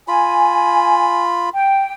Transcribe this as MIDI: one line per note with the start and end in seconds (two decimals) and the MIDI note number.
0.08 1.49 65
0.08 1.20 80
0.08 1.49 83
1.54 1.94 79